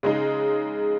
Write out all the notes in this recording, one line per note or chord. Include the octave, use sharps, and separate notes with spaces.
C#3 G#3 D#4